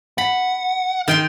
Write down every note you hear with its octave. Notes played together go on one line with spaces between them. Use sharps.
F#5 B5
D#3 G5 C6